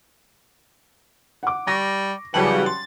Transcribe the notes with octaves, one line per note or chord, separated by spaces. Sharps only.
F#5 D6
G3 C#6 A#6
C#3 E3 F#3 G3 F#5 A5
C6 A6